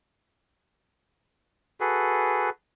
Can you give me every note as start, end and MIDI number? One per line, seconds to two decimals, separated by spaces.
1.80 2.50 66
1.80 2.50 68
1.80 2.50 69
1.80 2.50 71